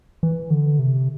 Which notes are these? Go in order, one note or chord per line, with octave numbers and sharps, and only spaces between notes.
E3
D3
C3